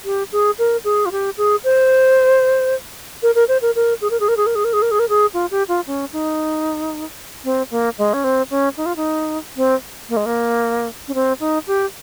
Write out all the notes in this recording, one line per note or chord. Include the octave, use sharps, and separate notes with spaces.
G4
G#4
A#4
G#4
F4
G4
G#4
C5
A#4
A#4
C5
A#4
A#4
G#4
A#4
G#4
A#4
G#4
A#4
G#4
A#4
G#4
A#4
G#4
A#4
G#4
F4
G4
F4
C#4
D#4
C4
A#3
G#3
C#4
C4
C#4
D#4
F4
D#4
C4
A#3
G#3
A#3
C#4
C4
D#4
G4